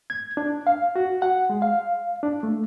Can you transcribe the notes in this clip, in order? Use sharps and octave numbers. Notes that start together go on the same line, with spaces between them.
G#6
D4
F5
F#4
F#5
G#3
F5
D4
A3